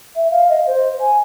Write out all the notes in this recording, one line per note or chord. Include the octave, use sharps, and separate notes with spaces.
E5
F5
D#5
C5
G#5